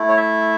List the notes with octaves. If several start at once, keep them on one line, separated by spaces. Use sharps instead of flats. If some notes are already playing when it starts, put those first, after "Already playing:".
Already playing: A3 E4
C#5
E5